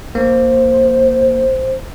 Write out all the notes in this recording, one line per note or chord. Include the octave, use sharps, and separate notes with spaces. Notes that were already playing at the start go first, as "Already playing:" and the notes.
A#1 A#3 C5